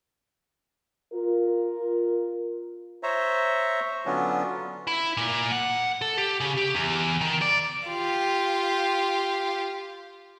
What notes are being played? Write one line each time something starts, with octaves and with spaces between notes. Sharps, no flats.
F4 A#4
C5 C#5 E5 A#5
D3 F#3 B3 C#4 D4 F4
E4
A#2
F#5
A4
G4
C#3
G4
E2
D#3
D5
F4 G4